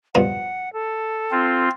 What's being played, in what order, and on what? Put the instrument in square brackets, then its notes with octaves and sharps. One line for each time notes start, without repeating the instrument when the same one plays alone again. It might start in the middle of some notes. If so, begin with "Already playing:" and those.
[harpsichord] G2 B2 F3 [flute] F#5
[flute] A4
[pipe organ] C4 F4